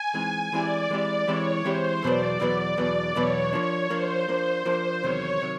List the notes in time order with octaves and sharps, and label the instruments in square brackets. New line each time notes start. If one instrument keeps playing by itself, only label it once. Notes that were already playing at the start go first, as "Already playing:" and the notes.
Already playing: [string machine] G#5
[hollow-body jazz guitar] E3 G#3 C4 D#4
[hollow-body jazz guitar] E3 G#3 C4 E4 G4 [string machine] D5
[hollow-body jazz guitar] E3 G#3 C4 E4 G4 [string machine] D5
[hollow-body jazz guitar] E3 G#3 C4 E4 G4 [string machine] C#5
[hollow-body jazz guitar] E3 G#3 C4 E4 G4 [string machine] C5
[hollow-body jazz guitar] E2 B2 F#3 B3 [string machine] D5
[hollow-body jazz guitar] E2 B2 F#3 B3
[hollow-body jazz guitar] E2 B2 F#3 B3 [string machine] D5
[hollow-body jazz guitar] E2 B2 F#3 B3 [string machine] C#5
[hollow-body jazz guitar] F3 A#3 D4 [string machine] C#5
[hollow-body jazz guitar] F3 A#3 D4 [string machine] C5
[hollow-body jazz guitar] F3 A#3 D4 [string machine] C5
[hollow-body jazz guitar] F3 A#3 D4 [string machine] C5
[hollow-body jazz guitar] E2 C3 D#3 F#3 [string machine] C#5
[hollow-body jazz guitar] C3 D#3 F#3